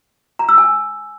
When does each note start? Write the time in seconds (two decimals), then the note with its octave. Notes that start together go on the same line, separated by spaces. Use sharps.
0.39 A#5
0.49 E6
0.58 G#5